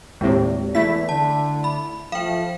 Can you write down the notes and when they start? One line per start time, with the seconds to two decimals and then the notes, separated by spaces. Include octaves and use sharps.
0.21 D#2 A2 C3 G#3
0.75 E2 A3 E4 B6
1.09 D3 A5
1.64 B5
2.12 F3 A3 F5 G5